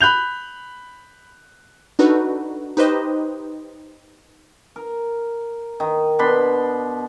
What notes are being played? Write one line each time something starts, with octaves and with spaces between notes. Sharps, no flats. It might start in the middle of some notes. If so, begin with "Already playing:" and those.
B5 F#6 G6 F7
D4 D#4 F#4 A4 B4
D#4 G4 B4 C5 D#5
A#4
D#3
B2 D4 B5 C6